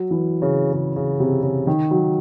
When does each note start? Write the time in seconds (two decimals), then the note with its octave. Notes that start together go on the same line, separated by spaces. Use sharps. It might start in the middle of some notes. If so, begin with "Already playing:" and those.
Already playing: F#3
0.11 E3
0.42 C#3
0.73 C#3
0.96 C#3
1.20 C3
1.43 C#3
1.67 D#3
1.91 F#3